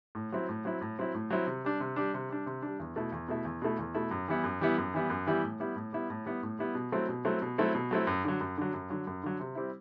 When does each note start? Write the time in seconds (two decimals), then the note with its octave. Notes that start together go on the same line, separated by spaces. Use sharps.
0.15 A2
0.32 F#3 C4 E4
0.49 A2
0.65 F#3 C4 E4
0.81 A2
0.99 F#3 C4 E4
1.14 A2
1.30 F#3 C4 E4
1.47 C3
1.65 G3 D4
1.80 C3
1.96 G3 D4
2.14 C3
2.29 G3 D4
2.46 C3
2.62 G3 D4
2.79 E2
2.96 B2 A3 E4
3.12 E2
3.28 B2 A3 E4
3.45 E2
3.62 B2 A3 E4
3.79 E2
3.95 B2 A3 E4
4.11 F#2
4.28 E3 G3 B3 E4
4.44 F#2
4.60 E3 G3 B3 E4
4.78 F#2
4.94 E3 G3 B3 E4
5.10 F#2
5.26 E3 G3 B3 E4
5.44 A2
5.60 G3 B3 E4
5.76 A2
5.93 G3 B3 E4
6.10 A2
6.25 G3 B3 E4
6.43 A2
6.59 G3 B3 E4
6.75 B2
6.92 F#3 A3 C4 E4
7.09 B2
7.25 F#3 A3 C4 E4
7.42 B2
7.58 F#3 A3 C4 E4
7.75 B2
7.91 F#3 A3 C4 E4
8.07 F#2
8.24 D3 F#3
8.41 F#2
8.57 D3 F#3
8.74 F#2
8.90 D3 F#3
9.07 F#2
9.23 D3 F#3
9.40 C3
9.55 G3 C4 E4